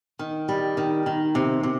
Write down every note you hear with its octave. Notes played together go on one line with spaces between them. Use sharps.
D#3
G3
D#3
D#3
C3
C3